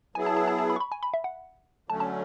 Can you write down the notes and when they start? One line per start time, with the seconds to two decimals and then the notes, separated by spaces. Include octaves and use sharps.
0.15 F#3 B3 E4 G#4 G#5
0.26 A5
0.37 A5
0.47 A5
0.59 A5
0.70 B5
0.76 C#6
0.80 B5
0.92 G#5
1.03 B5
1.14 E5
1.24 F#5
1.89 D3 F#3 A3 C#4 A5
2.00 A5